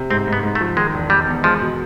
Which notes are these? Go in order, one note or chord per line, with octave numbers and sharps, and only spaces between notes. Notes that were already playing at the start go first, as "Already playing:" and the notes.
Already playing: C3
G#2 C4
G#2
B3
G#2
A3
F3
D#3 G#3
E1
E1 G3
E2
F3 G#3
B2